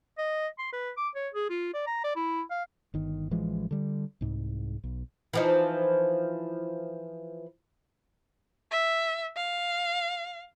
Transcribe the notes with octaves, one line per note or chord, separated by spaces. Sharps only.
D#5
C6
B4
D6
C#5
G#4
F4
D5
A#5
D5
E4
F5
G1 D#3
A1 E3 F3 G#3
D3 G3
C2 G#2
B1
E3 F3 D#4
E5
F5